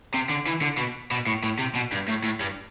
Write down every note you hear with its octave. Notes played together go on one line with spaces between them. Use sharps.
C3
D3
E3
D3
B2
B2
A2
A2
C3
B2
G2
A2
A2
G2